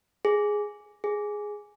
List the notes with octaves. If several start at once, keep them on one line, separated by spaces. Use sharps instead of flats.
G#4
G#4